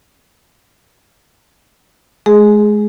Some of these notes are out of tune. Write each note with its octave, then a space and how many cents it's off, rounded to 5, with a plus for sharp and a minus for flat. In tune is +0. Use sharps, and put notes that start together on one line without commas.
G#3 +25 G#4 +0